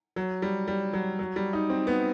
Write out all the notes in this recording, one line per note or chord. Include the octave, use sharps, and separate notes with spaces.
F#3
G3
G3
F#3
F#3
G3
D#4
C4
B3